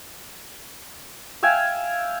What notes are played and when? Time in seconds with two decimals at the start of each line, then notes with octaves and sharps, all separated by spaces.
1.43 E5 F5 G5 G#5